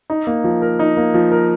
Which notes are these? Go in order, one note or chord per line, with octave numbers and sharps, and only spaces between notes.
D#4
A#3
F3
A#4
D#4
A#3
F3
A#4